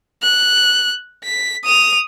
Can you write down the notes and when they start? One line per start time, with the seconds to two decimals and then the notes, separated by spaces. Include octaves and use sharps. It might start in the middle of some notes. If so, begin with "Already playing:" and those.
0.22 F#6
1.24 B6
1.65 D#6 F7